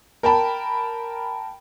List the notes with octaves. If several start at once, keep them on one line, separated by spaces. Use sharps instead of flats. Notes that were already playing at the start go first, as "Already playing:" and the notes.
A#4 G5 A5 B5